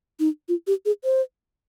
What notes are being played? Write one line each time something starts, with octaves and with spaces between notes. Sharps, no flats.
D#4
F4
G4
G#4
C5